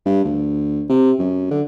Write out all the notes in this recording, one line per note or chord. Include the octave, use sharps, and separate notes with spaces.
G2
D2
C3
F#2
D3